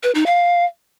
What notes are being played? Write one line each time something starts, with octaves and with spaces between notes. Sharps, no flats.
B4
D#4
F5